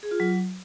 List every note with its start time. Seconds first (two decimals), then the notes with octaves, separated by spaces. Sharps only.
0.03 G#4
0.11 F4
0.20 F#3